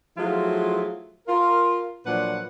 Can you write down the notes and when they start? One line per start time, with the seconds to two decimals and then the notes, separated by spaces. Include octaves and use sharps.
0.17 F3 F#3 A3 E4 F4 G#4
1.27 F4 A#4
2.05 A#2 F3 F#3 D4 B4 F#5